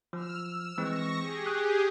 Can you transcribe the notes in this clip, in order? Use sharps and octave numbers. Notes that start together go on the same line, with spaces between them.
F3 E6 F6
E6
E3 G#3 C4 C#6 A#6
G4 G#4
D#6 F#6